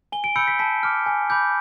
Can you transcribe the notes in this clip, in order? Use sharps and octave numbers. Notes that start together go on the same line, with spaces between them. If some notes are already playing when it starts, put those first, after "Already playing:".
G#5 G7
D7
B5 E6 G6 C#7
B6
A5 B6
D6 F6
G#5
B5 D6 G6